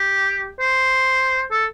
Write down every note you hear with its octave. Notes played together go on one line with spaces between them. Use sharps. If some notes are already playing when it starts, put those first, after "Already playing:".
Already playing: G4
C5
A4